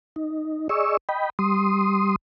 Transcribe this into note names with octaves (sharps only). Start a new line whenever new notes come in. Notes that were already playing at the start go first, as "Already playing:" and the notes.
D#4
G#4 D5 D#5 C#6 E6
D#5 G5 B5
G3 C6 D#6